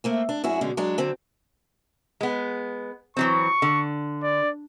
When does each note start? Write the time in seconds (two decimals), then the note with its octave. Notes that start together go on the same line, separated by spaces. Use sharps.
0.04 A3 A#3 C4
0.29 D4
0.44 F#2 E4 F#4 G#4
0.61 B2 D3 G#3 C#4
0.77 F#3 G#3 D4
0.98 D3 F#3 C4
2.21 G#3 B3
3.17 E3 F#3 C4 C#6
3.62 D3
4.23 D5